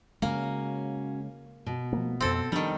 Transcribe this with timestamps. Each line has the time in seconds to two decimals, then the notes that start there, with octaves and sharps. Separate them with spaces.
0.22 C#3 G#3 A#3 C#4 F#4
1.66 B2
1.93 F3 A3 A#3
2.20 E1 F2 C4 A4
2.52 D#3 F3 G3 D4